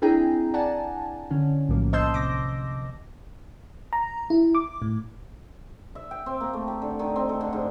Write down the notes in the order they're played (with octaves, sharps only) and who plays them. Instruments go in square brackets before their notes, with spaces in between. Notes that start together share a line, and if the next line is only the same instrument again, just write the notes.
[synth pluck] C4 D4 E4 G#4 G5 A#5
D5 F#5 G#5 A5
D3 C#4
B1 A2 F3 F#3 A#3
C5 D#5 A5 C6 E6 G6
C3 D6 A#6
[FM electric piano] A#5
E4
D6
A2
[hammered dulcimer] E5
G5
C4
A#3
A3
G4
D3
D#3
C4
A4
D3
G#2